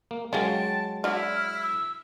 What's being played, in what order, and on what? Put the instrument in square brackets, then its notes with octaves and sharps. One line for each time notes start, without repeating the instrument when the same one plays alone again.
[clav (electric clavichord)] A#3
[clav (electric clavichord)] F#3 G#3 [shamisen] C#4 F4 A#4 [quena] G5 [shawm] A5
[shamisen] D4 F#4 [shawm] E4 [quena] F6
[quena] E6